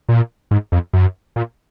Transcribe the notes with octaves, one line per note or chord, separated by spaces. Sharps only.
A#2
G#2
F2
F#2
A#2